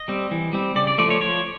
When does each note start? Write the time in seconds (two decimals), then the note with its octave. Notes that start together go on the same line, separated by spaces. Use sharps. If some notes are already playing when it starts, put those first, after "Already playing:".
Already playing: D#5
0.08 G3 C4
0.31 E3
0.53 G3 C4
0.76 C#3 D5
0.87 D5
0.98 F3 A3 D5
1.10 C#5
1.21 F3 C#5